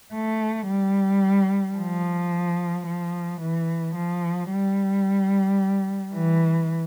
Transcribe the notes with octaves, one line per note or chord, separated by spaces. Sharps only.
A3
G3
F3
F3
E3
F3
G3
E3